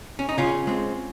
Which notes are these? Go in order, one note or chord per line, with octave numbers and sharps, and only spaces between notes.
C#4
D#4
C#3 C#4 F4
G#3 C4